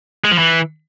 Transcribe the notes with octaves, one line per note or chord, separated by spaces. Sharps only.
G#3
F3
E3